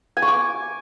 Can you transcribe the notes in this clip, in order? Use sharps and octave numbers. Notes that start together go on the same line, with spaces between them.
G#5
C#6
D6